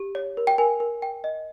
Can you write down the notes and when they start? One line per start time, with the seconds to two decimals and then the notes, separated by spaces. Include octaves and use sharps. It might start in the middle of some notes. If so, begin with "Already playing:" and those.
Already playing: G4
0.15 C#5
0.37 A#4
0.47 G5
0.58 A#4 G#5
0.80 A#4
1.02 G5
1.24 D#5